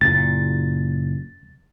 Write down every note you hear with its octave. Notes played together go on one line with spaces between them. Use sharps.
F#1 A#2 A6